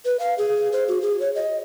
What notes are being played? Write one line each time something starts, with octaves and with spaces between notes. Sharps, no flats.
B4
F5
G#4
C5
F#4
G#4
C#5
D#5